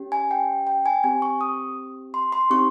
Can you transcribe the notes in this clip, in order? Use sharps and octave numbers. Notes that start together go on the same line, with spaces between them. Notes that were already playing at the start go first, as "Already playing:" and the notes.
Already playing: C#4 G4
G#5
G5
G5
G#5
C4 G4 G#5
C#6
D#6
C6
C6
C4 D#4 G4 C#6